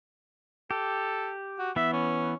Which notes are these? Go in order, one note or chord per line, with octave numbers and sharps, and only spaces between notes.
G4 A4
F#4
E3 B3 E5
C#4